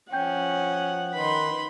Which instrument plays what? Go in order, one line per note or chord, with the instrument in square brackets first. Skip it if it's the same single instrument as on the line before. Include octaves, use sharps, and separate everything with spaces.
[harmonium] F3 [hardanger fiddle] C#4 [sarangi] F#5 [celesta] G5 G6
[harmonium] D#3 D#4 B4 [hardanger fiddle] B5 C6